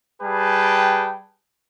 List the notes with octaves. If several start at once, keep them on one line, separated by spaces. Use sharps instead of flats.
G3 G#4 B4 G5 A5